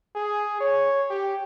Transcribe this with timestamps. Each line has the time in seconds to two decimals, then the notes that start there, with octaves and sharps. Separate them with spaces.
0.15 G#4
0.61 C#5
1.10 G4